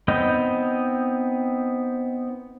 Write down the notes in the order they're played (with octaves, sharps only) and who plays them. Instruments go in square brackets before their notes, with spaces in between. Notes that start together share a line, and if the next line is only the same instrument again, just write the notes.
[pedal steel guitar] B3 C4 D#4 D#5 G5